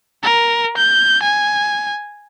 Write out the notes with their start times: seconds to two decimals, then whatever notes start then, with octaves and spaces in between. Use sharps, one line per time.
0.23 A#4
0.77 G6
1.23 G#5